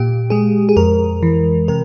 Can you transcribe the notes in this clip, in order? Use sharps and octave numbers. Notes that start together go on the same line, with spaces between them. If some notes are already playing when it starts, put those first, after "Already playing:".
Already playing: A#2 G4
G#3 G#4
G#4
F2 A#4
E3
C3 A#4